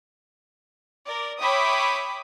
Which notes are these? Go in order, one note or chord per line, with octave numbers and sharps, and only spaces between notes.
A#4 D5
C#5 E5 G5 B5 D6 D#6